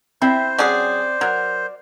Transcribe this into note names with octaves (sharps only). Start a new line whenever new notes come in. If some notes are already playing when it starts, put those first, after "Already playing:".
C4 E4 C5 E5
F#3 C#4 G#4 D5
F#3 A#4